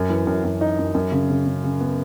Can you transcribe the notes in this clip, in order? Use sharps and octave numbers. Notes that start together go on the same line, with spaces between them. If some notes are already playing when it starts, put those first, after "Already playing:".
Already playing: F#2
E3
F#2
F#2
D#4
F#2
F#2
C#3
C#3
C#3
C#3
B3